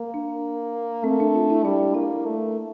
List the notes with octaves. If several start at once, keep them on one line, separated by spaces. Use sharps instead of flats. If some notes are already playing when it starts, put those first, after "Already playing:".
Already playing: A#3
D4
A3 C4
D4
F4
E4
G3 D4
A#3 E4
A3